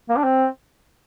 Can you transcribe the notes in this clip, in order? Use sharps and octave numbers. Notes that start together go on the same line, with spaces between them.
A#3
D4
C4